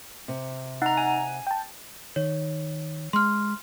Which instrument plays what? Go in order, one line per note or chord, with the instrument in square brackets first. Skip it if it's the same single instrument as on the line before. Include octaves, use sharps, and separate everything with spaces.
[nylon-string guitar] C3
[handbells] D#4 A#5 [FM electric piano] F#5
[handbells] G#5
[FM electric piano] G5 A5
[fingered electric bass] D#3 [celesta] C#5
[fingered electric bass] G#3 [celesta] C6 F6